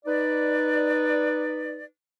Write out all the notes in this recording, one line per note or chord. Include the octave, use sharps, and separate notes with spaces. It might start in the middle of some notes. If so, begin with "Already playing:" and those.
D#4 B4 D5